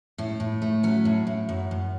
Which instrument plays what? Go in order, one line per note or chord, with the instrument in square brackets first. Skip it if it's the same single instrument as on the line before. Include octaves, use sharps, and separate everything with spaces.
[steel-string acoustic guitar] A2 C#4
A2
A3
F#3 C#4
A2
A2
F#2
F#2